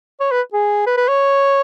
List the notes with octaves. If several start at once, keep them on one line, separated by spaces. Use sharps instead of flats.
C#5
B4
G#4
B4
B4
C#5